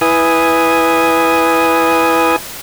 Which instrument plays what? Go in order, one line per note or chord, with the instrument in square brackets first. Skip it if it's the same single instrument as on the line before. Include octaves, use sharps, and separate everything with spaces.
[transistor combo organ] E4 B4 G#5 D#6